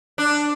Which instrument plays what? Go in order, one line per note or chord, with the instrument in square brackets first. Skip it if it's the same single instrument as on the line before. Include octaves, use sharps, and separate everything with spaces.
[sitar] D4